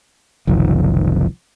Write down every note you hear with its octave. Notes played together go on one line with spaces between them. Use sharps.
F#1 C2 D#3 F3